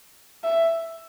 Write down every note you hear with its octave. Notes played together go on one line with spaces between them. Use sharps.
E5